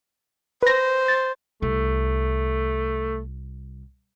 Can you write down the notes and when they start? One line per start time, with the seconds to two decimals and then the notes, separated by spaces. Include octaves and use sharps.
0.63 B4 C5 A#6
1.08 A6
1.62 C2 A3